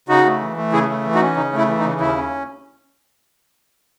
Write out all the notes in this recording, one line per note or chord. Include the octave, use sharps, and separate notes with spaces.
C#3 D#4 F#4
A3
E3
A3
C#3 E4 G#4
A3
E3
D#4 F#4
C#4
C#3 D#4
A3 E4
E3
D#4
C#3
D#2 E4
C#4